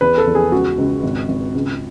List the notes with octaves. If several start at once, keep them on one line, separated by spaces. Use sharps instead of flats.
E2 B4
A4
E2
G#4
C#2 F#4
C#2
G#1
G#1
C#2